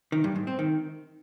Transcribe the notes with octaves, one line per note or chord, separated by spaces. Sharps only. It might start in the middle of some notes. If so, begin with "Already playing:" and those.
D#3
G2
G#2
C4
D#3